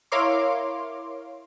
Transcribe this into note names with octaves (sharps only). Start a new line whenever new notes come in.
E4 A#4 C#5 F5 C6 D6